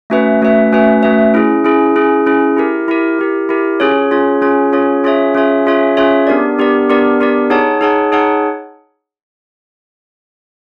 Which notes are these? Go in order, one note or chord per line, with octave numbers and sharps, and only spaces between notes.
A3 C#4 F#4 B4 E5
A3 C#4 F#4 B4 E5
A3 C#4 F#4 B4 E5
A3 C#4 F#4 B4 E5
C#4 E4 G#4
C#4 E4 G#4
C#4 E4 G#4
C#4 E4 G#4
E4 G4 A#4
E4 G4 A#4
E4 G4 A#4
E4 G4 A#4
C#4 F4 G#4 C#5
C#4 F4 G#4 C#5
C#4 F4 G#4 C#5
C#4 F4 G#4 C#5
C#4 F4 G#4 C#5 E5
C#4 F4 G#4 C#5 E5
C#4 F4 G#4 C#5 E5
C#4 F4 G#4 C#5 E5
B3 D4 G4 A#4 D5
B3 D4 G4 A#4 D5
B3 D4 G4 A#4 D5
B3 D4 G4 A#4 D5
D#4 G#4 C#5 F#5 A5
D#4 G#4 C#5 F#5 A5
D#4 G#4 C#5 F#5 A5